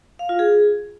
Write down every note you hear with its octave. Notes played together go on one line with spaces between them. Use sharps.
F5
F4
G#4